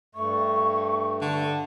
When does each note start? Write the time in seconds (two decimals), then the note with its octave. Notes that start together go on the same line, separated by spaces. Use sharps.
0.15 G2 A3 C#6
1.21 D3